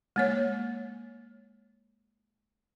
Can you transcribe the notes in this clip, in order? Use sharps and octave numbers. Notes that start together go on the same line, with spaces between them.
G#3 A#3 C#5